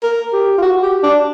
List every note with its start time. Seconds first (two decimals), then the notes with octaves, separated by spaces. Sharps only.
0.03 A#4
0.33 G4
0.58 F4
0.62 F#4
0.83 G4
1.03 D4